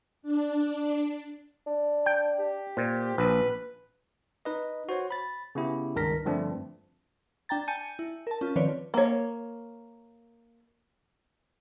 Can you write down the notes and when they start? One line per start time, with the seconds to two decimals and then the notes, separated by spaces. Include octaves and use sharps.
0.22 D4
1.67 D4
2.06 G5
2.39 G4
2.77 A#2 C5
3.18 A#1 B4
4.45 D#4 B4 D#5
4.89 F#4 C5 C#5
5.11 B5 A6
5.55 C#3 B3 E4 G4
5.95 C#2 G2 D#3 A#4 A#6 B6
6.26 G2 D3 F3 A3 C4 D4
7.49 D4 G5 A#5 A6
7.68 G#5 A5 G6 C#7 D#7
7.99 E4
8.27 A#4 A5
8.41 C#4 F4
8.56 D#3 F3 C4 B4 C#5 D5
8.94 A#3 C#5